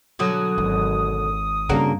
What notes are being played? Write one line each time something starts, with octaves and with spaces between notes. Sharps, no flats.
B2 D3 F#3 D#6
G#1
G2 C#3 A#3 C4 D4 F#4 A4 A#4